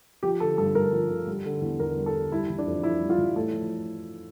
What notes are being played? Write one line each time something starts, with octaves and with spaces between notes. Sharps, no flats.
F3 G4
D3 A4
G2 A4
G2 A#4
F3
D3
G3
D3
E2
E2 A#4
G3
A4
D3
G3 E4
E3
D4
F2
F2 E4
G3
F4
E3
A2 A4
F3